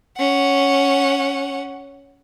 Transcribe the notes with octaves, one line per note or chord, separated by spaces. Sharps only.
C#4 F#5